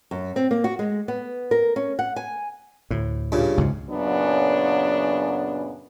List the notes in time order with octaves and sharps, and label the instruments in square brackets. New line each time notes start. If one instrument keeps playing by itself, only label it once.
[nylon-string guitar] F#2
C4
A#3
F#4
G#3
B3
A#4
C#4
F#5
G#5
[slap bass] D2 A2
[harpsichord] G2 A#2 C#3
[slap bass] C#2 G#2 C#3
[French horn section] F#2 A#2 C#3 F#3 B3 D4